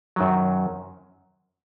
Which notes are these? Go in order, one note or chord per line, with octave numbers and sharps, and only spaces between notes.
F#2 D#3 F#3